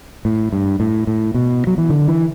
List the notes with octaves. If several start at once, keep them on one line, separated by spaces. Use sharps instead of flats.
A2
G2
A2
A2
B2
F#3
E3
D3
E3